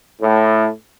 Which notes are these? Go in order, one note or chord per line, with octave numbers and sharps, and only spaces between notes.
A2